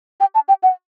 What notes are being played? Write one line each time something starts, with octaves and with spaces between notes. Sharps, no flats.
G5
A5
G5
F#5